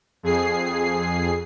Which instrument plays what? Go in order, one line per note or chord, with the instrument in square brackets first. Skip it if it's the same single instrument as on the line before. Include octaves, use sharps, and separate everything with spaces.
[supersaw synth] F2 G#4 C7